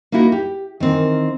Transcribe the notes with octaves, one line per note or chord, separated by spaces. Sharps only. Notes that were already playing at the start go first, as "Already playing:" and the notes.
A#3 D#4 E4 F#4 A#4
G4
D#3 E3 C4 A#4